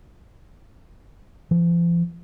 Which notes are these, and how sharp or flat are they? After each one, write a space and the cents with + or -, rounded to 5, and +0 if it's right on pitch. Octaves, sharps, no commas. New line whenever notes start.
F3 -40